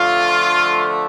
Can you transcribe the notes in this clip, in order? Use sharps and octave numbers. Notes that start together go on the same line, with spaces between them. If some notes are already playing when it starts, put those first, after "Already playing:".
Already playing: D3 F3 A3 F4